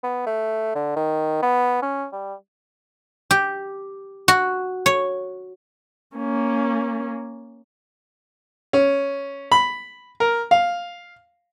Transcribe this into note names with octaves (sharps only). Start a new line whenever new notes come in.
B3
A3
D3
D#3
B3
C#4
G3
G4
F#4
C#5
A#3 C#4
C#4
B5
A#4
F5